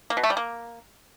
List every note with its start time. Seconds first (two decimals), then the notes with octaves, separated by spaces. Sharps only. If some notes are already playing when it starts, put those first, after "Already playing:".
0.10 A#3
0.17 B2
0.24 A3
0.30 G3
0.37 A#3